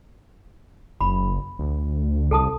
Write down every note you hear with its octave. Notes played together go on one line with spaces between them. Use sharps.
F#1 B5
D2
C2 A4 A5 D#6